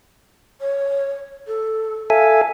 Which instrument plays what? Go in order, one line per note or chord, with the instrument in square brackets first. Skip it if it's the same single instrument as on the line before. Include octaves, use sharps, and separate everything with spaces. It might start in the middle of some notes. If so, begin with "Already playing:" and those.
[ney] C#5
A4
[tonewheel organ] A4 E5 G#5 [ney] F5